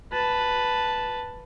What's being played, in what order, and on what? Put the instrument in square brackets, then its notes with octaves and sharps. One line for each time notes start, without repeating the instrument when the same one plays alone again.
[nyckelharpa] B4 A5